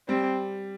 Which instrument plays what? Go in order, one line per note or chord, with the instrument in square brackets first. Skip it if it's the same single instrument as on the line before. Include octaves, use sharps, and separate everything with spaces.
[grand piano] G3 [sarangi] C4